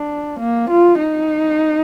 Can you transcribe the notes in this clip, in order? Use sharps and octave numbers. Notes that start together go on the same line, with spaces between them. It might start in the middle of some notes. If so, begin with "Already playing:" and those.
Already playing: D4
A#3
F4
D#4